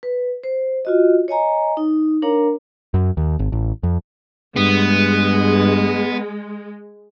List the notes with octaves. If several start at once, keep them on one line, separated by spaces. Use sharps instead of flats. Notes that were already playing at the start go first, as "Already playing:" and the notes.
B4
C5
F4 F#4 D#5
C#5 D#5 G#5 A#5
D#4
D4 A#4 C#5 F5 A#5
F#2
D#2
G#1
A1
F2
G2 G#3 B3